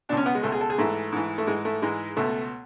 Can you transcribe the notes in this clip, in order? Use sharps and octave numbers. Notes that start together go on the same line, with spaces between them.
C#2 B2 C#4 D4
B3
G#3
C#2 B2 A3
G#4
A4
G#4
G#2 E3 A3
G#2 E3
A3
G#2 E3 G#3
A3
G#2 E3 G#3
C#2 B2 A3